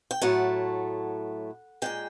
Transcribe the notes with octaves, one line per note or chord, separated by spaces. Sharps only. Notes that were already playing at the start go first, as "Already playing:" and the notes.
G5
A2 F#3 A3 F#5
A#2 F3 G#3 G5